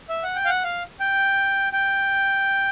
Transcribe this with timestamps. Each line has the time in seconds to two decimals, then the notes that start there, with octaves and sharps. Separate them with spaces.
0.09 E5
0.23 F#5
0.36 G5
0.45 F5
0.49 F#5
0.64 F5
1.00 G5
1.73 G5